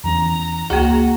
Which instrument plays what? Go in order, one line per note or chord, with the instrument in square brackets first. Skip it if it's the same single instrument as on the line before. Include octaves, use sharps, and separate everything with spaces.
[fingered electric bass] E2 E3 C#4 [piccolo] A#5
[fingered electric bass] C#2 [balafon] A#3 G#4 [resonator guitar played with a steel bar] F#4